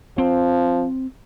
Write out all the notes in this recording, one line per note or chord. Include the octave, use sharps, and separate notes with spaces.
F3 C4